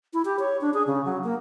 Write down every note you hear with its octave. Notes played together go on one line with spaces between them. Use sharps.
E4
G4
C#5
D4
G#4
C#3
F#3
A#3